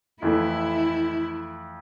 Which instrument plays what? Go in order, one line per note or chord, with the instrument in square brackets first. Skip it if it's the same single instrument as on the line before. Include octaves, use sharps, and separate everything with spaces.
[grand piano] F2 E3 A3 [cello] E4